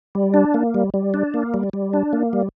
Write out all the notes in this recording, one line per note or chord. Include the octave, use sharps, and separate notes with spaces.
G3
D4
A#3
G3
G3
D4
A#3
G3
G3
D4
A#3
G3